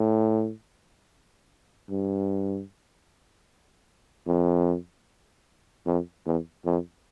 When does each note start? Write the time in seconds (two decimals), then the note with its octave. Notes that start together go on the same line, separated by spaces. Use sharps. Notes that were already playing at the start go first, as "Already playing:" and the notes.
Already playing: A2
1.90 G2
4.27 F2
5.86 F2
6.26 E2
6.65 F2